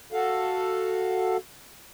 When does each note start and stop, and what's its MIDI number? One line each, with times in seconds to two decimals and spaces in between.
0.12 1.37 66
0.12 1.37 69
0.12 1.37 77